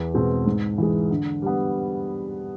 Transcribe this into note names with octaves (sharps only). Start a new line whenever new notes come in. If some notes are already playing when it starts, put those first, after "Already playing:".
Already playing: E2
B2 G#3 C4
G#2
E3 G#3
D3
G3 B3